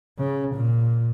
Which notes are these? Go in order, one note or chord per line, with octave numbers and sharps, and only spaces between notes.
C#3
A#2